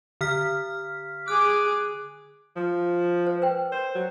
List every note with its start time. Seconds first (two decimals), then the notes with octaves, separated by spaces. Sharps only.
0.21 D3 F6 B6
1.28 G#4 D6 F#6
2.56 F3
3.27 C5
3.42 B4 C5 G5
3.72 A#4 C5
3.95 F#3